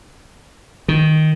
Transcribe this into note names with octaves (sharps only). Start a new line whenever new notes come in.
D#3